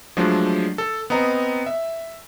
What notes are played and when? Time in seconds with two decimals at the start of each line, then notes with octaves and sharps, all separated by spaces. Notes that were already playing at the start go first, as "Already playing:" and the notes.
0.17 F3 F#3 G#3 A3 D4
0.78 A4
1.10 B3 C4 D#5 A#5
1.66 E5